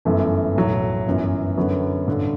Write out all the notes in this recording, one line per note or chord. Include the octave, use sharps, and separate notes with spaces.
G1 F#2 E3 A3
B1 A2 F#3
G1 F#2 E3
F#2 D3 F#3 B3
A1 G2 D3